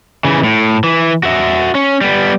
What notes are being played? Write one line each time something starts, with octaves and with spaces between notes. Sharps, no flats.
C#3 E3
A2
E3
F#4 E5
C#4
G3 B3